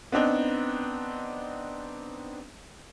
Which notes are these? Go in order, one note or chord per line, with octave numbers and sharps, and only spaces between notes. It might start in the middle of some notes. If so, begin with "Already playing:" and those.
B3 C4 D4 D#4